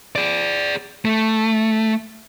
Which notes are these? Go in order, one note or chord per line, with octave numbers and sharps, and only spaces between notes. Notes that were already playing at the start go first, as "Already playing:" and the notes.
G#4 D5
A3